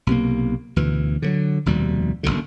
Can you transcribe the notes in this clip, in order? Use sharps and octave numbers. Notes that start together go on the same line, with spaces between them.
B1 C3 A#3
D2 B2 E3
D3 E3 F#3
F1 D#2 B2 G3
F#1 B1 F#2 D3